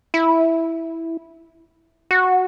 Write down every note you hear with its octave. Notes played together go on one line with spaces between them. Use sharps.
E4
F#4